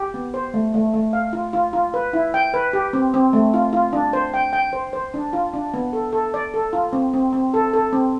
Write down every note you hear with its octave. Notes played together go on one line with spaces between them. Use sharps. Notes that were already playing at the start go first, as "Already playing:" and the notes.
Already playing: G4
B3
C5
A3
A3
A3
F5
F4
F4
F4
B4
E4
G5
B4
G4
C4
C4
A3
F4
F4
D4
C5
G5
G5
C5
C5
D4
F4
D4
B3
A4
A4
D5
A4
F4
C4
C4
C4
A4
A4
C4